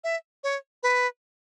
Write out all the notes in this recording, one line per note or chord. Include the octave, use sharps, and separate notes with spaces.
E5
C#5
B4